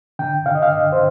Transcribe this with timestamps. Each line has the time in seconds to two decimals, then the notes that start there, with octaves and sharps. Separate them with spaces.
0.19 D3 G5
0.46 D3 F5
0.55 D#5
0.62 F5
0.72 D3 D#5
0.92 C5